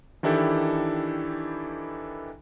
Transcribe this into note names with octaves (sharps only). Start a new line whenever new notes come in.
D#3 E3 D4 E4 G4 A4